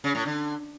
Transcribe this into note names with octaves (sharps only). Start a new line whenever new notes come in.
C#3
A2
D3